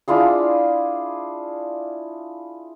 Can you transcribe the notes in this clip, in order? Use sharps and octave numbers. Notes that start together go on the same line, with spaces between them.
D4 E4 F4 G#4